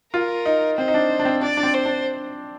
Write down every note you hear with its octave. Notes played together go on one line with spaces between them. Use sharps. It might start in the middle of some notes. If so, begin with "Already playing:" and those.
F4 A#4
D#4
C4 C5
D#4
D4
D4
C4
D4 D5
D4
C4
C5
D4